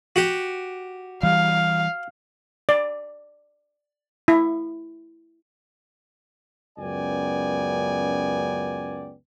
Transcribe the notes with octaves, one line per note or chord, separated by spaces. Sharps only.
F#4 G4
E3 G3 F5
D5
E4
C#2 F#2 B3 D5 G5 G#5